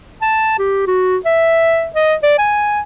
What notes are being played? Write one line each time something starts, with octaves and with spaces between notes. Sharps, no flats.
A5
G4
F#4
E5
D#5
D5
G#5